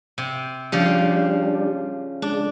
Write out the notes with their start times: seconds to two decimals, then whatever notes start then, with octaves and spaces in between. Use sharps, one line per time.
0.18 C3
0.72 C#3 F3 G3 D4 G4
2.22 G#3 D4